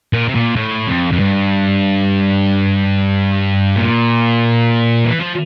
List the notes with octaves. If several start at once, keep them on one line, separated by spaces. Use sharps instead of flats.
A#2
C3
A#2
A2
F2
F2
G2
A#2
E3
F3